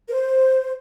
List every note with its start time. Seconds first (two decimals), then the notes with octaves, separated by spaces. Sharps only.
0.08 A#4
0.12 C5